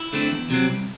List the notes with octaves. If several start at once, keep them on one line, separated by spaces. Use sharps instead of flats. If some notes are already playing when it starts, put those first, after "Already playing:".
Already playing: E4
D3 A3 C4
E2
C3 F#3 C4
C2